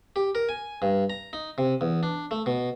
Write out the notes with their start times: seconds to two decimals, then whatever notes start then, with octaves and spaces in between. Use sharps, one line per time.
0.16 G4
0.35 A#4
0.49 G#5
0.82 G2
1.10 A#5
1.33 D#4
1.58 C3
1.81 E2
2.03 D4
2.31 A3
2.46 B2